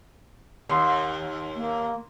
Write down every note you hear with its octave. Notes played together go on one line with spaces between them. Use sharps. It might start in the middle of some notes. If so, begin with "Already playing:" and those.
D#2 C6
A#3